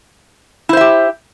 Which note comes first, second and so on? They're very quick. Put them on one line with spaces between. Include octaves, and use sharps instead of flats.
E4 C5 E5 G4